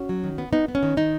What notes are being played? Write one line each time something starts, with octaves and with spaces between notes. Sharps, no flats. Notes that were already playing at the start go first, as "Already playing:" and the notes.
Already playing: C#4 F#4
F#3
D#3
B3
B3 D#4
B3
C#4
D#3
D#3 D#4